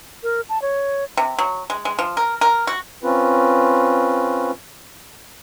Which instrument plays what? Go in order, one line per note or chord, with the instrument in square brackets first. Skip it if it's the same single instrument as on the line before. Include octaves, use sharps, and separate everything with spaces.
[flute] A#4
A5
C#5
[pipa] C3
F#3
G#3
G#3
F3
A#4
A#4
F#4
[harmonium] C4 C#4 F4 B4